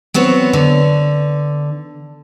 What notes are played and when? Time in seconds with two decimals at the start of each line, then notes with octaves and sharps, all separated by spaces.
0.14 F#3 B3 C4 C#5
0.53 D3